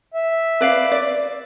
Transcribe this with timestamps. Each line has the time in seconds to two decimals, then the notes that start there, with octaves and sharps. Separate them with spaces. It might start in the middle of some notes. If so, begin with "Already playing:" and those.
0.14 E5
0.61 B4 D5 F5
0.92 D5